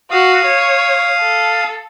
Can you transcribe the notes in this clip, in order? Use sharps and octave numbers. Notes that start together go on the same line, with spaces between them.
F#4 F5 D#6
C#5
A4